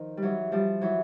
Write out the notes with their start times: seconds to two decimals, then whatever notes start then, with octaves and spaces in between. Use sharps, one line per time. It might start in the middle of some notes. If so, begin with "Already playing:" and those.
Already playing: D#3 F3
0.17 G3
0.22 E3 F#3
0.52 F3 G3
0.81 E3 F#3